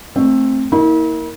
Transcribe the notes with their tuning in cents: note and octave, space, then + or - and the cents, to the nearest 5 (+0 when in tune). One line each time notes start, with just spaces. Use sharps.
A3 +0 C4 +15
A#3 +0 E4 -40